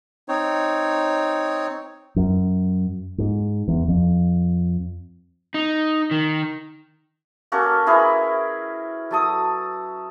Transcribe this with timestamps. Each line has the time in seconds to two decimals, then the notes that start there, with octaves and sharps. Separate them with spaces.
0.29 C4 D#4 C#5
2.16 F#2
3.18 G#2
3.68 E2
3.88 F2
5.54 D#4
6.11 D#3
7.52 A#3 C#4 F#4 A4
7.86 E4 G#4 A#4 B4
9.11 F#3 A4 D#6